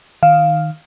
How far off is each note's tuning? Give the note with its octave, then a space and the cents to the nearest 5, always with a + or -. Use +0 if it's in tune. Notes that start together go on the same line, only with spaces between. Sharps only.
D#3 +0 F5 +0